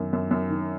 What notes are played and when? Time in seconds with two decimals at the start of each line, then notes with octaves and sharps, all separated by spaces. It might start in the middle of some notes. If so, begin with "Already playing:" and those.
Already playing: F#2 D#3
0.13 F#2
0.31 F#2
0.50 D#3